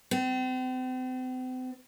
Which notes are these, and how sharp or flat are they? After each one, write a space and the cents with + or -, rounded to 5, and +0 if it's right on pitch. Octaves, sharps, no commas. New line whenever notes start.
C4 -40